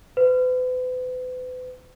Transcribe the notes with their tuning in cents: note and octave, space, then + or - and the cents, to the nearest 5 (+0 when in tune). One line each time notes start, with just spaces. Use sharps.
B4 +40